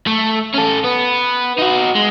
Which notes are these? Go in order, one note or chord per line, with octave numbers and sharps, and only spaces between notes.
A3
C#4 A4
B3
D#4 F#4
G#3